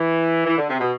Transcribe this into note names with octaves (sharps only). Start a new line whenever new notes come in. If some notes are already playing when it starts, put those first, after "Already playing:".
Already playing: E3
E3
D3
C3
B2